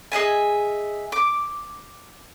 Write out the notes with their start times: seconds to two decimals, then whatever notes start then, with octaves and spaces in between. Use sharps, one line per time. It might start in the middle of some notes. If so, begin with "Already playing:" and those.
0.12 G#4 D#5 E5 G#5
1.12 D6